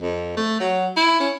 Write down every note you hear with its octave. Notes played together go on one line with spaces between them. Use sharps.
F2
A3
F#3
E4
C#4